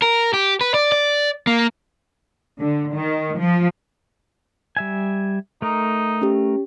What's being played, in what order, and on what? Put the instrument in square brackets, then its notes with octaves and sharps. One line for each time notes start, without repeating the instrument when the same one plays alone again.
[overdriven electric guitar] A#4
G4
B4
D5
D5
A#3
[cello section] D3
D#3
F3
[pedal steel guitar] G3 E5 G#5
[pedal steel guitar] A3 A#4 [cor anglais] D#4
[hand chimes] C#4 G4